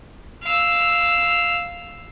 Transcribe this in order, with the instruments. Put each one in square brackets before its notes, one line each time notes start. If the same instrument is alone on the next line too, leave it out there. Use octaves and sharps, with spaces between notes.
[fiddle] F5 E6